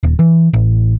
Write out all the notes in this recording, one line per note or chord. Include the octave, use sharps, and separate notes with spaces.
D#1
E3
A1